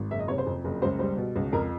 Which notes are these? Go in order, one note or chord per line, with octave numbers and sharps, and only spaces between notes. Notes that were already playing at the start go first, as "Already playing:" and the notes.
Already playing: G#1
F#1 E5
D#5
C3 C#5
C5
F2
F#1
C#2 C5
G3 C5
B2
C#2
F2 A#4